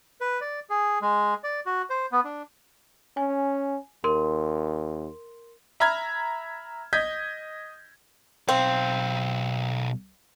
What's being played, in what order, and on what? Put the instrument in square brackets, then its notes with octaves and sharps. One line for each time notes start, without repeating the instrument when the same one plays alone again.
[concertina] B4
D5
G#4
G#3
D5
F#4
C5
B3
D4
[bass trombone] C#4 [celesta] G#5
[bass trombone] D#2 [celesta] A#4 C6
[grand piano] E5 A#5 B5 F6 G#6
D#5 G6 G#6 B6
[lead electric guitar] B1 F5 [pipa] C4